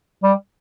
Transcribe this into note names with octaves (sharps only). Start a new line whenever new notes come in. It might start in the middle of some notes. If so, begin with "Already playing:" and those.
G3